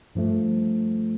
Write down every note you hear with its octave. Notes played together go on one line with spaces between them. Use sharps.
G2 F3 A3